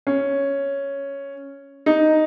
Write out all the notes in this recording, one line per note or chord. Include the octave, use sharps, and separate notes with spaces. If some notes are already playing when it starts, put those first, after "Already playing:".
C#4
D#4